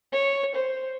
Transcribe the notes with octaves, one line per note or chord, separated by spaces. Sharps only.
C#5
C5